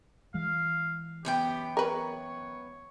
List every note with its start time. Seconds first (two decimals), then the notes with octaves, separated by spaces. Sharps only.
0.34 E3 G#3 F5
1.25 F#2 B3 G4 G5
1.77 A#4 B4 C#5